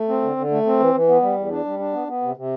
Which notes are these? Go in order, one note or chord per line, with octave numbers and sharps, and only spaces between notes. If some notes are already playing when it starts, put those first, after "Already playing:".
Already playing: A3
C4
D3
D3
A3
C4
E3
E3
B3
G3
E2
D4
G3
D4
B3
B3
C3
C3